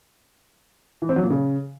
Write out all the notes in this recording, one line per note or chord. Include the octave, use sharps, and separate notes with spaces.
E3
C4
F#3
A#2
C#3